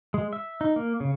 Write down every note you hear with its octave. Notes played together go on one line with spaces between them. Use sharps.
G#3
E5
D#4
A#3
C#3